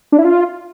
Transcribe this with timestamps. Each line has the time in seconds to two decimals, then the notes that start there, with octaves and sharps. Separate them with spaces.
0.12 D4
0.19 E4
0.25 F4